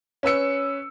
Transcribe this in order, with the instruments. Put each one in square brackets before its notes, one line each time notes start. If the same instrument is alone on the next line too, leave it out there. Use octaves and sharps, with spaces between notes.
[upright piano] C#4 B4 E6 C#7